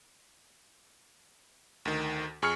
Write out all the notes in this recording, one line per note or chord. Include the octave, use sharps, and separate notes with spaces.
D2 D#3
F2 G#4 C#6 F6 C#7